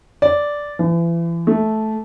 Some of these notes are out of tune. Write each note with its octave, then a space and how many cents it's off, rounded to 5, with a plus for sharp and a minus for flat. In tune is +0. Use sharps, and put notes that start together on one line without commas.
D5 -5
E3 +35
A3 -10